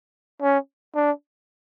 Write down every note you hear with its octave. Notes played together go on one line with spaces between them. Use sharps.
C#4
D4